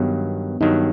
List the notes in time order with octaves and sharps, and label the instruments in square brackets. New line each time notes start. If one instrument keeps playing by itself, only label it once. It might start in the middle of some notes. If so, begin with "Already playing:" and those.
Already playing: [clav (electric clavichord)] G2 D#3 F#3 [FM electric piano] B3
[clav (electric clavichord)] G2 D#3 F#3 [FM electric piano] D#4